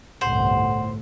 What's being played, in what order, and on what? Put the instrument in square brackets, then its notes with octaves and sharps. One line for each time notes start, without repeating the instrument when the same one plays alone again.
[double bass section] G1 C2 [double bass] A2 A3 [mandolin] C5 [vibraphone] F#5